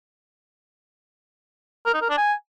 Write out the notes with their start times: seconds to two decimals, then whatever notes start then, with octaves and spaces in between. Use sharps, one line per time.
1.86 A#4
1.94 D#4
2.02 A#4
2.10 D4
2.18 G#5